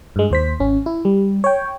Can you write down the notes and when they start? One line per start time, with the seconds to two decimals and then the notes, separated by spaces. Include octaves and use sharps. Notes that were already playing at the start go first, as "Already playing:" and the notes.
0.16 G2 G#3
0.31 D#2 C5 B6
0.60 G#1 C#4
0.86 E4
1.05 G3
1.44 C#5 G5